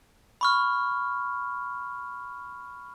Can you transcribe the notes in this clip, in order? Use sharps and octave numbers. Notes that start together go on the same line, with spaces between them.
B5 C#6 F6